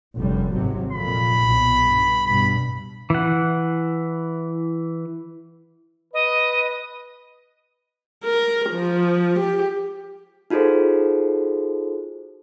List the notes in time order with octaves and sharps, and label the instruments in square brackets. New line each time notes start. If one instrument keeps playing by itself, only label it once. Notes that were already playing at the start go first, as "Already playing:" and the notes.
[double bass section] F1 F#2 G3
G#1 C3 F#3
[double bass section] F2 A#2 [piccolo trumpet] B5
[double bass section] B1
G2
[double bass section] G2 B2 [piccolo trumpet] B5
[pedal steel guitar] E3 F#5
[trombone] B4 [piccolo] D#5
[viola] A#4
F3
G4
[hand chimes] D#4 F4 F#4 G#4 A4 C5